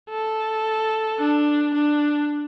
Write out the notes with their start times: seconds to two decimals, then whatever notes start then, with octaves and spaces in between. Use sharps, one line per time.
0.10 A4
1.19 D4
1.74 D4